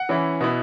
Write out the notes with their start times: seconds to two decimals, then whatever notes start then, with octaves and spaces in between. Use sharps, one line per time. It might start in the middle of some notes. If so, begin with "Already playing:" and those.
Already playing: F#5
0.09 E3 C#4 E4
0.41 B2 B3 E4